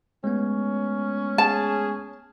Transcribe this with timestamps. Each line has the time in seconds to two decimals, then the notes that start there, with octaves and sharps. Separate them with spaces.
0.24 G#3 A3 B3 C#4
1.38 G#4 A5